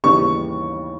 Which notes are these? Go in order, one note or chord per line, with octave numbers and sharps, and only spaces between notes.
D#2 C#3 E3 G3 C#6